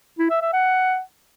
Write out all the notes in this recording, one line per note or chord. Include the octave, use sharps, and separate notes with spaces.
E4
E5
E5
F#5